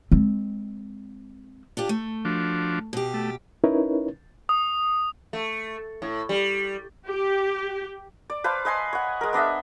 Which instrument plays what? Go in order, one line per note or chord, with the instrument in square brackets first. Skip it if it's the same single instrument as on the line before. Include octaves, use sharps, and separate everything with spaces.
[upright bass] G#3 C4
[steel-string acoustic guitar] D4 F4 G4
A3
[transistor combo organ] F3 D4 F#4
[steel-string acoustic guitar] B2 G4
[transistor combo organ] A3
[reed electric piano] C#4 D#4 E4 A#4 B4 C#5
[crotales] D#6
[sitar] A3
A2
G3
[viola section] G4
[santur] D5
B4 C5 F5 A5
B4 D#5 G#5 C6
C#5 F#5
G#3 A#4
B3 D4 D#5 E5